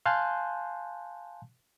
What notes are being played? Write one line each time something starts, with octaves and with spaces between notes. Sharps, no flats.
F5 G#5 A5 C6 F#6 G6